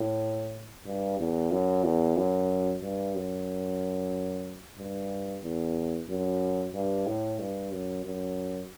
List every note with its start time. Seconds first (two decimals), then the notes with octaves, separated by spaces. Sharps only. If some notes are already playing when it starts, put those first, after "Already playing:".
Already playing: A2
0.86 G2
1.19 E2
1.51 F#2
1.84 E2
2.16 F#2
2.82 G2
3.15 F#2
4.78 G2
5.43 E2
6.09 F#2
6.74 G2
7.06 A2
7.39 G2
7.72 F#2
8.04 F#2